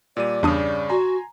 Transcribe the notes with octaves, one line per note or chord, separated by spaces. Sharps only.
A#2 G3 D5 D#7
E2 G2 C#3 D4 D#6
F#4 G#5 A#5 C6